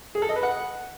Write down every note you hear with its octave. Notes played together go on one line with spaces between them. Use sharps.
G#4
A4
D#5
B4
F#5